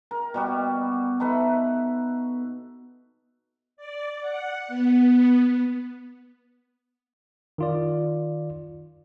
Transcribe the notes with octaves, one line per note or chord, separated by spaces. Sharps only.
A#4
B2 G3 F#4
D#4 A4 B4 E5
D5
F#5
B3
D#3 F4 D5